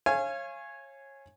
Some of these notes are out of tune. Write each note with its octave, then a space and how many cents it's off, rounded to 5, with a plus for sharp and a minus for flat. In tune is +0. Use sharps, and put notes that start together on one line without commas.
C#5 -25 F5 -30 G#5 +0